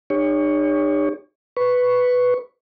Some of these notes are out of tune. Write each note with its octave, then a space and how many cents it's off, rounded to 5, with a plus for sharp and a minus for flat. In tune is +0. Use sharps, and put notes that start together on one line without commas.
D#4 -45 G4 +45 C#5 +10
B4 +5 C#6 +0